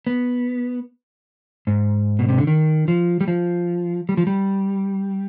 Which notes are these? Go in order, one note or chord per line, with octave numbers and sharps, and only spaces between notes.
B3
G#2
B2
C3
D3
D#3
F3
G3
F3
G3
F3
G3